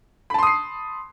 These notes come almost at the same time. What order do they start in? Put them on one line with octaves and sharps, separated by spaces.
B5 A5 C6 D#6 C7